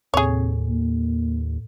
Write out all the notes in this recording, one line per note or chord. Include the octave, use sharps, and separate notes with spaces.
D#2 A2 C3 G#4 C#5
D#2 A#3